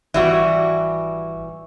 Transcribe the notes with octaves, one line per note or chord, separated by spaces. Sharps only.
G#1 E3 G3 F#4 E5 E6